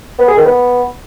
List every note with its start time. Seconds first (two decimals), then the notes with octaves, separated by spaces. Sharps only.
0.19 B3
0.28 G#4
0.37 D#3
0.46 B3